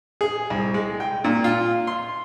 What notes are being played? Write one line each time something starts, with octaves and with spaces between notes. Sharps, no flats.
G#4
C2
G#3
G5
A#2
F4
C6